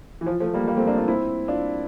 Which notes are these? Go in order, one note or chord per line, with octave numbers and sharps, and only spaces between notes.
E3
F3
F3 A3
G3 A#3
G3 A#3
A3 C4
A#3 D4
D4 F4
C4 E4
D4 F4